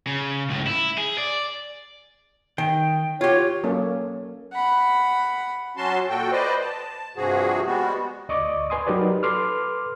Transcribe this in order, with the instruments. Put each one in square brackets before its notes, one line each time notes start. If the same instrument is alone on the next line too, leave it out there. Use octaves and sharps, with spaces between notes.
[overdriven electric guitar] C#3
C#2 A2
E4
G#4
D5
[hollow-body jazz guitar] D#3 [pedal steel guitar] G5
[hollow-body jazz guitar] F4 G4 [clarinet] C#5
[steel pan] F#3 A#3 C#4 A4
[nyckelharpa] F#5 B5
[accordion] F#3 C#4 F#4 A5 C6
A#2 F#4 A4 G5
B4 C5 D5 D#5
A5
G2 C3 F3 F#4 G#4
G3 G#3 B3 F#4
[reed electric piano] D2 D5 D#5 C#6 D6
B4 G#5 C6 D#6
F#3 D#4 G4 A#4 B4 D5
A4 B4 C6 D6 F6